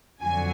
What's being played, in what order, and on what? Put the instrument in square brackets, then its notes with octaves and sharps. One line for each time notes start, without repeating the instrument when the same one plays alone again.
[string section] F2 D3 F#3 G#5